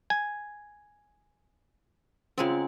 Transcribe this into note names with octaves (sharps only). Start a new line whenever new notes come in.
G#5
C#3 G#3 C4 C#4 F4